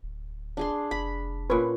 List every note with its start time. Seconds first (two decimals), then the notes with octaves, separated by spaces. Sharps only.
0.03 D1
0.57 D4 G#4 C6
0.91 F1 B5
1.50 A#2 C#4 B4